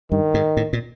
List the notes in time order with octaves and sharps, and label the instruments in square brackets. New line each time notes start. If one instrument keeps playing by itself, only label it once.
[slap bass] G2 [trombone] D#3
[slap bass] G#2
A2
A#2